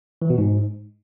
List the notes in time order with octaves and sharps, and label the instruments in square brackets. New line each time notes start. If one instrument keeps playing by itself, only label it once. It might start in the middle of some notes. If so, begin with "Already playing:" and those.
[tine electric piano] E3
B2
G#2